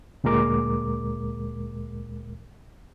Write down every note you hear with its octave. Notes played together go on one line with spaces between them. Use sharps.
D2 A#2 G#3 A#4 D6